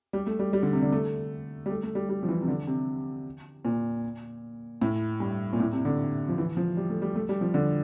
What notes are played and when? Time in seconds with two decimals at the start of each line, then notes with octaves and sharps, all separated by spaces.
0.13 G3
0.27 A3
0.39 G3
0.53 G3
0.63 D3
0.73 C3
0.82 D3
0.92 A3
1.66 G3
1.70 A3
1.83 A3
1.95 G3
2.09 G3
2.23 F3
2.29 E3
2.42 C3
2.48 D3
2.67 C3
3.65 A#2
4.82 A2
5.20 G2
5.53 A#2
5.60 A2
5.72 C3
5.85 D3
6.28 F3
6.38 E3
6.57 F3
6.77 G3
6.90 A3
7.02 G3
7.15 A3
7.29 G3
7.41 F3
7.54 D3